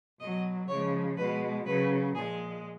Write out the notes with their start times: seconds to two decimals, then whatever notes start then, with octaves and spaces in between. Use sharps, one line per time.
0.20 B2 F#3 D#5
0.68 C#3 F3 G#3 C#5
1.17 B2 G#3 B4
1.66 C#3 F#3 B4
2.14 A#2 F3 G#3 G#4